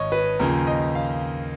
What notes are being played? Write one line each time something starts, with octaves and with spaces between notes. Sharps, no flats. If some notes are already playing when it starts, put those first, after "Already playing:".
Already playing: G#1 D#3 C#5 D#5
B4
D#2 C#3 F3 A#4
D#5
F5